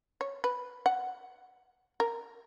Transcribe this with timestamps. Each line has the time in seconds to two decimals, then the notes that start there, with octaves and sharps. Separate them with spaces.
0.21 C#5
0.44 B4
0.86 F#5
2.00 A#4